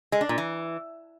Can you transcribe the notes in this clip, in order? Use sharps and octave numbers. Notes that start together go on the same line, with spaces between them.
G#3
D4
A#2
E3